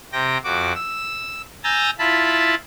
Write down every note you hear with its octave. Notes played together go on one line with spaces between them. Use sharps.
C3 G5 A#6
F2 F#4 D6
E6
G#5 A#5 E6 G6 A6 A#6
E4 F4 A5 B5